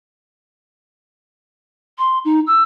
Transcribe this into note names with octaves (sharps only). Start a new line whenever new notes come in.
C6
D#4
E6